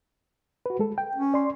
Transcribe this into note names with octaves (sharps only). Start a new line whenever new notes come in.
F#4 B4
G#3 A4
G5
C#4
D5 C6